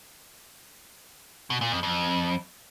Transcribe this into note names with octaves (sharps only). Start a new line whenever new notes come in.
B2
A#2
F2
F2